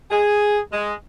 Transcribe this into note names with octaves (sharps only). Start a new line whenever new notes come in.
G#4
G#3